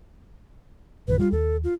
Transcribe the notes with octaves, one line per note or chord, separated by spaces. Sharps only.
A#1 F#2 D#3 B4
G3 F4
D#2 A4
F4